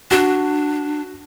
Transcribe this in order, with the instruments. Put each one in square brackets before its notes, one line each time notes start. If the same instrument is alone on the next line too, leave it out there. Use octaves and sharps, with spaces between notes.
[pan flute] D4 [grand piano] F#4